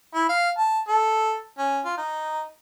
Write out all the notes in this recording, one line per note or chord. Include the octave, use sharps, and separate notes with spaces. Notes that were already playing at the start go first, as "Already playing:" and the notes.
E4
F5
A5
A4
C#4
F4
D#4